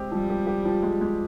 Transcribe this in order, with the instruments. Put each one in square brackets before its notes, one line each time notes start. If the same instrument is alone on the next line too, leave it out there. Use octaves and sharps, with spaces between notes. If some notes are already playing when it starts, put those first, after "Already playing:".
Already playing: [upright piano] G#3 C4 G4
[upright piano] F3 [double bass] G3
[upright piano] G4
G4
F3
G#3
G#3